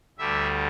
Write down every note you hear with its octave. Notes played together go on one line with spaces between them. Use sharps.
D2 D3 G3 E5